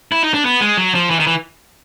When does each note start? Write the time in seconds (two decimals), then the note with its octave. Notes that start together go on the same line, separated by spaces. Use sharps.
0.12 E4
0.23 D#4
0.34 D4
0.45 B3
0.61 G#3
0.78 F#3
0.95 F3
1.11 E3
1.20 D#3
1.27 E3